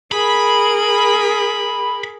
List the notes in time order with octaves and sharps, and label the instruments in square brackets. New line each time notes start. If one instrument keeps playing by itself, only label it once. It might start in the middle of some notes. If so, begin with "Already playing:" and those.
[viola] G#4 A#4 [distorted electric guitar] B5